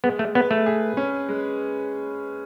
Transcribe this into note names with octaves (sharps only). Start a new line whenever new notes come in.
G#3 B3
A3
B3 B4
A3
G#4
C#4
G#3